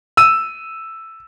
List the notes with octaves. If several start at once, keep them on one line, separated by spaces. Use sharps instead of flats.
E6 D#7